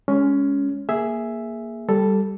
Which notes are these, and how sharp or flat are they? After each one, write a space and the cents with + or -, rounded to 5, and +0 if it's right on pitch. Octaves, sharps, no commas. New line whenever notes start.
G#3 +0 C#4 +15
A#3 +0 G#4 +0 E5 +0
G3 +0 A4 +0